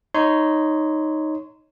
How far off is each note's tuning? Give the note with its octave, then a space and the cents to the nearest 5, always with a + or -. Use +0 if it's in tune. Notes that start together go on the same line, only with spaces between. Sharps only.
D#4 +0 C#5 +0 C6 -25